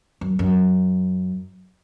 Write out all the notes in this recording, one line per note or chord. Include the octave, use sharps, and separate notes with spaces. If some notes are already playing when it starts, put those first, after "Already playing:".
F#2
F#2